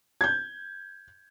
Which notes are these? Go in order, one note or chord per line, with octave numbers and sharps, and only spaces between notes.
G6 G#6